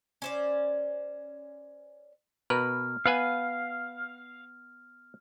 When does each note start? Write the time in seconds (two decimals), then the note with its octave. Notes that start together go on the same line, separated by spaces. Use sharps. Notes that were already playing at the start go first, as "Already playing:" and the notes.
0.22 C#4 C5 D5
2.50 B2 A#4 B4 F6
3.06 B3 B4 F5 G#5